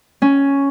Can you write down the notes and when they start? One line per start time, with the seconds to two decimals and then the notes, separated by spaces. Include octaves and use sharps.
0.22 C#4